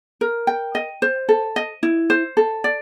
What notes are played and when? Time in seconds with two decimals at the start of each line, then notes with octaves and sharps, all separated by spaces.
0.21 A#4
0.47 G5
0.75 D#5
1.02 C5
1.29 A4
1.56 D#5
1.83 E4
2.10 C5
2.37 A4
2.64 D5